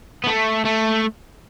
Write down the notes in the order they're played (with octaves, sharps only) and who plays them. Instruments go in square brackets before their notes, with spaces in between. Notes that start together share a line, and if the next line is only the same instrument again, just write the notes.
[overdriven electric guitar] B3
A3
A3